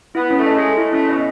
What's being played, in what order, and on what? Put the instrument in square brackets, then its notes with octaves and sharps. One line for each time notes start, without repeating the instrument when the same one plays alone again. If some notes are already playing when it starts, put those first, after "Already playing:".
[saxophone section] B3 [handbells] E4
[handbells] C#4
[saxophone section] A3
[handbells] D#5
[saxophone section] G#3
[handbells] A4
[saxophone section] A3 [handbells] E4
[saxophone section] A3 [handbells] C#4
[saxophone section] B2 [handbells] D#5